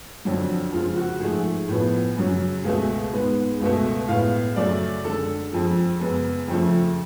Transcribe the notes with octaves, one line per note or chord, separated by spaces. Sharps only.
F2 D3 F#3
F2 C#3 G#3 F4
F#4
G#2 F3 A3 G#4
A2 F3 B3
F#2 C#3 F#3
C#2 B2 A3 G#4
G#2 G#3 B3
C#2 B2 A3
A2 G#3 B3 F5
F#2 C#3 F#3 A3 D5
F#2 D3 G#3 A4
F2 F3 G#3
F#2 C#3 G#3 B3
F2 C#3 F3 A3